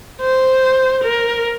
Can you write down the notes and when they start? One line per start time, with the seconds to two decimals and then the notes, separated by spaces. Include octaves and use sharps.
0.21 C5
1.04 A#4